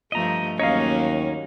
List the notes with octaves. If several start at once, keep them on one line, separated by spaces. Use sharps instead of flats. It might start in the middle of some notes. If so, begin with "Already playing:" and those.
G2 F3 A3 D#5 A#5
D#2 F#3 A#3 C#4 D#4 C#5 D#5 F5